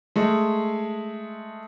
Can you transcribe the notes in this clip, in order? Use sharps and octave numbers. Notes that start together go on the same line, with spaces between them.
G#3 A3